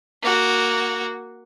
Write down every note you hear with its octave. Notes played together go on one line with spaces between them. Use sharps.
A#3 F#4